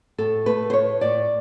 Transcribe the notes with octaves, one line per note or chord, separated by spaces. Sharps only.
A2 A4
A3 B4
C5
A2 C#5
A2 D5